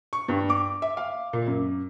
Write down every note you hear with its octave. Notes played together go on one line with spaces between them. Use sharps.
C#6
G2
D6
E5
F5
A#2
F#2